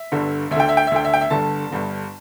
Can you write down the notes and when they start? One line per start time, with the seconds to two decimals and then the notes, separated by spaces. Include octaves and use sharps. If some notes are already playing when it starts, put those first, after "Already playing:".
Already playing: E5
0.12 G1 G2 D3
0.51 D2 E5
0.56 D3 G5
0.69 E5
0.77 G5
0.87 E5
0.91 D2 D3 G5
1.05 E5
1.14 G5
1.21 E5
1.30 G1 G2 D3 A5
1.71 G1 G2 D3